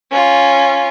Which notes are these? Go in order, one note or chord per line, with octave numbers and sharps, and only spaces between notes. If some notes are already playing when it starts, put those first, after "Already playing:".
C#4 F4